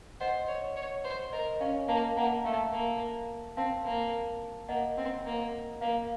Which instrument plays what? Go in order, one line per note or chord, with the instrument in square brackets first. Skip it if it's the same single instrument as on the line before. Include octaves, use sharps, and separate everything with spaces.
[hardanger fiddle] C5 [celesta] D#5 F#5
[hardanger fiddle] C#5
C#5
C5
[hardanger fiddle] A#4 [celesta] D#5
[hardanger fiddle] C#4 [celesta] F5
[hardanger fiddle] A#3 [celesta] F5 A5
[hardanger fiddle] A#3 [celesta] F#5 A#5
[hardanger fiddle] A3 [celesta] F5 A5
[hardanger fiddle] A#3
[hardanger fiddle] C4 [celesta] F5 A5
[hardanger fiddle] A#3
[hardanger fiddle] A#3 [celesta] D#5 F#5
[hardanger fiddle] C4
A#3
[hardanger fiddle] A#3 [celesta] F5